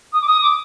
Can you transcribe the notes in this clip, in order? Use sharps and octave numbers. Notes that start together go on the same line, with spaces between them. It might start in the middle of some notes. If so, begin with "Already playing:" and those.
D#6
D6
D#6
D6